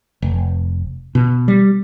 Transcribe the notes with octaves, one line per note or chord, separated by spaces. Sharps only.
F1
B2
G3